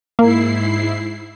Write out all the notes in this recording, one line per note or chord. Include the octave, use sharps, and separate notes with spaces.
G#2 A#3 E4 C7